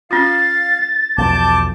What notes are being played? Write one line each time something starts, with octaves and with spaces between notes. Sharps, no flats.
C#4 F4 F5 A6
B1 E2 F3 A5 D6 G6